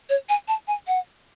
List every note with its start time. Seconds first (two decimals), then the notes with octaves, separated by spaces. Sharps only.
0.09 C#5
0.29 G#5
0.48 A5
0.68 G#5
0.87 F#5